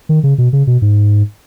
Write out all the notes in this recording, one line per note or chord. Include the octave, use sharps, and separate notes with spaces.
D#3
C#3
B2
C#3
B2
G#2